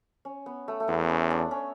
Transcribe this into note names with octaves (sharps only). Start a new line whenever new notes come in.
C#4
B3
A3
A3
E2 B3
B3
C#4
D4
C#4